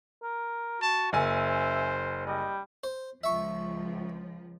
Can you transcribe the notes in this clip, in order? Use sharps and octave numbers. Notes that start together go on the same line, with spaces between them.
A#4
F#4 A5
F#1 C5 E5 G#5
G3 D#5
C5
C#2 F3 E5 C#6